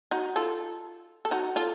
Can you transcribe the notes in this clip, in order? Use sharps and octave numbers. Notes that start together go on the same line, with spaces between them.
D#4 F#4
F4 A4
A4
D#4 F#4
F4 A4